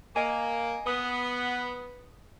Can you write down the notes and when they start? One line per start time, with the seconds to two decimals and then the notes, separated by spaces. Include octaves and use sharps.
0.16 A#3 D#5 G#5
0.87 B3 D#6